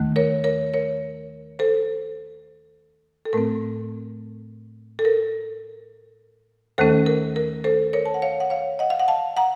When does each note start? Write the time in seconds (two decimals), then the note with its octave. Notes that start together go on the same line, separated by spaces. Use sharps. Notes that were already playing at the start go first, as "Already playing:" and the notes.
Already playing: D#2 D#3 A3
0.16 A#4 C#5
0.44 A#4 C#5
0.74 A#4 C#5
1.59 A4 C5
3.25 A4
3.33 A2 A3 C4 A#4
4.99 A4
5.05 A#4
6.78 D#2 D#3 A3 C#4 A4 C5
7.06 A#4
7.36 A#4
7.64 A4 C5
7.93 A#4 C#5
8.06 A5
8.14 F#5
8.22 C#5 F5
8.40 F#5
8.50 C#5 F5
8.79 D#5 F#5
8.90 F5
8.99 F#5
9.08 F5 A5
9.37 F#5 A#5